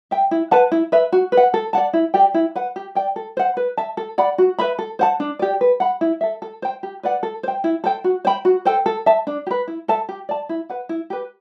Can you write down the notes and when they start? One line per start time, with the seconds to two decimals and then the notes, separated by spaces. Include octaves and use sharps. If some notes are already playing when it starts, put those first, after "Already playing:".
0.11 E5 G5
0.31 E4
0.51 B4 F#5 A5
0.72 E4
0.92 B4 E5
1.12 F#4
1.32 B4
1.37 F#5
1.54 A4
1.73 D5 F#5 A5
1.93 E4
2.14 G4 D5 G5
2.34 E4
2.55 B4 F#5
2.76 G4
2.95 D5 G5
3.16 A4
3.37 C5 F#5
3.57 B4
3.77 E5 A5
3.97 A4
4.18 D5 F#5 B5
4.38 F#4
4.59 B4 E5 B5
4.79 A4
4.99 C5 F#5 A5
5.20 D4
5.39 G4 D5
5.61 B4
5.80 F#5 B5
6.01 E4
6.21 A4 E5
6.42 A4
6.62 C5 G5
6.83 G4
7.03 B4 D5 F#5
7.23 A4
7.43 C5 G5
7.64 E4
7.84 A4 C5 G5
8.04 F#4
8.25 C5 G5 B5
8.45 F#4
8.65 A4 C5 G5
8.86 A4
9.06 E5 A5
9.27 D4
9.47 G4
9.51 B4
9.68 E4
9.88 A4 E5 A5
10.09 G4
10.29 D5 A5
10.49 E4
10.69 B4 F#5
10.89 E4
11.10 G4 B4